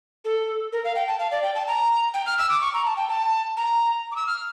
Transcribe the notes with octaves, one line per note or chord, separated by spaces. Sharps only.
A4
A#4
F5
G5
A5
F5
D5
G5
A5
A#5
G5
F6
E6
D6
C#6
A#5
A5
G5
A5
A#5
D6
E6
F6